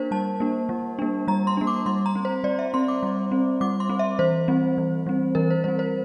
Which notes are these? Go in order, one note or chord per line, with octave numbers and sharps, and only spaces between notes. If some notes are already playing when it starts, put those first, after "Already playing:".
Already playing: A#3 D4 A#4 C5
G3 A5
A#3 D4
G3
A#3 D4
G3 A#5
C6
A#3 D4
D6
G3 C6
A#5
C4
C5
G3 D5
E5
C4 C6
D6
G3
C4
G3 D6
C6
C4
E5
E3 C5
G3 C4
E3
G3 C4
E3 A#4
C5
G3 C4 C5
C5